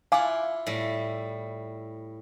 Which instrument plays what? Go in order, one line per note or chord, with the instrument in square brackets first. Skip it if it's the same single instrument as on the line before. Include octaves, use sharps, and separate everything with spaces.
[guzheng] E4 F4 F#5 [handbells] F5 G#5 D6
[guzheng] A2 G3